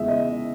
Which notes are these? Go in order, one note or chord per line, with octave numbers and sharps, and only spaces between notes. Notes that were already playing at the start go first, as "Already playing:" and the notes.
Already playing: E2 C#3 G#3 E5
D#5